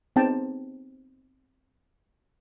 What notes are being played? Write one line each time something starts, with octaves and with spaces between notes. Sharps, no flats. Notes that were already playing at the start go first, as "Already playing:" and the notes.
B3 C4 D#4 G#4 G5 A5